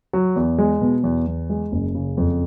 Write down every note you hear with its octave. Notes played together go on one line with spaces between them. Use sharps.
F#3
E2
G#3
B2
E2
E2
G#3
F#1
C#3
F2